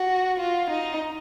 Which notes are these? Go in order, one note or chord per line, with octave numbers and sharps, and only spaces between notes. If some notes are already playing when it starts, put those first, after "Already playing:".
Already playing: F#4
F4
D#4